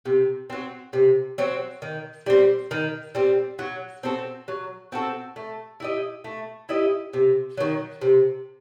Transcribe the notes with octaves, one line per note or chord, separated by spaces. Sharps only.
C3
F#3 C4
C3
F#3 C4
D#3
G3 C4
D#3
G3 C4
F#3
C4 F#4 A4
F#3
C4 F#4 A4
A3
E4 G4 D#5
A3
E4 G4 D#5
C3
D#3 F#3
C3